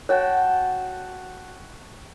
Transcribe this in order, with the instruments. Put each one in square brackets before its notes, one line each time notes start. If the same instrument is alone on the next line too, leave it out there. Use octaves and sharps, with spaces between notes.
[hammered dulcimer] F#4 G5 A5 [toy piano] C#5 F#5